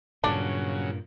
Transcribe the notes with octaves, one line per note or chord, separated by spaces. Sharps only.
G2 A#2 C#3 F#3 D4